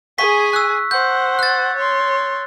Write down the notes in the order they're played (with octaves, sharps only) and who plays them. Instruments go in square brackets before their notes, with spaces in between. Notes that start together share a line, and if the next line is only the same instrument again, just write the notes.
[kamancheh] G#4 G#5 [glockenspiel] C#6 B6
[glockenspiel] E6 F#6
[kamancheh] C5 F#5 [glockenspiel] G6
[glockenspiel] F#6 A6
[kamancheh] C#5 C6